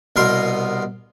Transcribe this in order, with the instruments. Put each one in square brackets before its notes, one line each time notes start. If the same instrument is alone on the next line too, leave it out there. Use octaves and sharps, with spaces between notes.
[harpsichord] C2 B2 A#4 C6